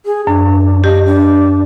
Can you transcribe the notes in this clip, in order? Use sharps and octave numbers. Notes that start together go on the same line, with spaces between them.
G#4
F#2 D4
G4 D#5
D4